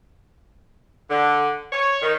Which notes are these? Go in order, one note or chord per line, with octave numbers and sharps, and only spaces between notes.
D3
C#5
D#3